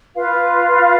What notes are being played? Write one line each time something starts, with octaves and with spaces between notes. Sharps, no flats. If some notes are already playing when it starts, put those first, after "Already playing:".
F4 B4 F5